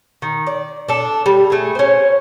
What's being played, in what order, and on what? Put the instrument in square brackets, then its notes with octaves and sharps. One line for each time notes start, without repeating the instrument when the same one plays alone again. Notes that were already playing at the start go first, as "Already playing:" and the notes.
[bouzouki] D#3
D5
D4 A4
G3
A3 G#4
C#4 C5